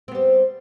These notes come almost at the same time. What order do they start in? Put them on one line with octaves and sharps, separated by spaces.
C4 B3 G3